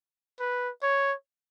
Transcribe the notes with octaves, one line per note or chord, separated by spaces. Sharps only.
B4
C#5